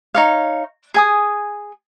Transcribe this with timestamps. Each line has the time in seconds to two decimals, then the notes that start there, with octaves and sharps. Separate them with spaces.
0.14 D#4 C#5 F5
0.94 G#4 G#5 D#6